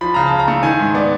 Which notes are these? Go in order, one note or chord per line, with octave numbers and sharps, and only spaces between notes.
F3 B5
C#3 A#5
A5
C#3
A#5
A3
D#3 G#5
G#2
B3 D5